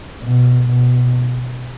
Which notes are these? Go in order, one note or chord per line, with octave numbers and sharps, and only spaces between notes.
B2
B2